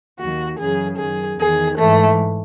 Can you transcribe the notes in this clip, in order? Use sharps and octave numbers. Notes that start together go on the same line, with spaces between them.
D#2 D#3 F#4
F#2 C#3 E3 G#4
F#2 D#3 G#4
E2 D#3 G#4
G#2 E3 A3